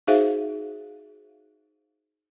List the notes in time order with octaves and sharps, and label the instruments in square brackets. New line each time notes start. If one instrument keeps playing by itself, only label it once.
[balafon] D#4 F#4 G#4 C5 E5 F5